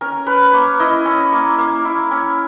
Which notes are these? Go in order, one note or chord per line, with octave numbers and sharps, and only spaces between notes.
C#4 A#4
C#4 B4
A#3 C#5
E4 D#5
C#4
A#3
A#3
E4
C#4